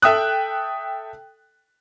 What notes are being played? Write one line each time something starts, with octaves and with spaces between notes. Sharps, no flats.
A4 E5 G5 D#6 F#6